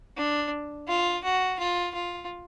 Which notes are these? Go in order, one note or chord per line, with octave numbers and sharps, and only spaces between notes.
D4
F4
F#4
F4
F4